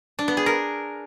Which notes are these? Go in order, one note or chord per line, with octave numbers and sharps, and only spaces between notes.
D4
B3
G#4
A#4